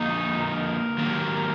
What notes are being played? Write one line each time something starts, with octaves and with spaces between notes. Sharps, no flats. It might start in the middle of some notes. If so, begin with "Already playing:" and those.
Already playing: D3 F3 A#3 D#4
A#4
D#3 F#3 A#3